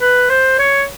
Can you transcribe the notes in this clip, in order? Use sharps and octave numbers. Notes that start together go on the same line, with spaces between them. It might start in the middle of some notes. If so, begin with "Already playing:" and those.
B4
C5
C#5